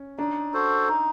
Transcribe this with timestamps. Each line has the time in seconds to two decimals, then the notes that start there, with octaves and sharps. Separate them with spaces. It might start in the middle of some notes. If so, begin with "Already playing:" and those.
Already playing: C#4
0.19 D4 D#4
0.54 F#4 A4 C5
0.89 D#4